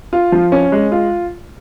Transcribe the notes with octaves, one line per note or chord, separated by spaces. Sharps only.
F4
F3
C#4
G#3
F4